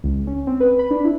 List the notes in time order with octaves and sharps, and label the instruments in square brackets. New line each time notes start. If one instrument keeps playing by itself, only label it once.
[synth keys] C#2
C#4
C4
B4
B5
D4
E4